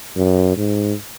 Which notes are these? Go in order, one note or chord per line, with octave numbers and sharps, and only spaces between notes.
F#2
G#2